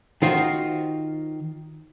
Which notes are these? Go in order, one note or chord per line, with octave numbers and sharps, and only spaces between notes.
D#3 F4 F#4 C5